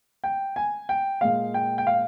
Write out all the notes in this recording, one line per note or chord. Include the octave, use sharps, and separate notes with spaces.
G5
G#5
G5
A#2 G#3 F5
G5
G5
F5